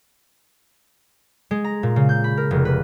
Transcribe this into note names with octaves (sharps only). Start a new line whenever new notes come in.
G#3
A#5
A#2
C#3
G6
B5
A#4
F1
B4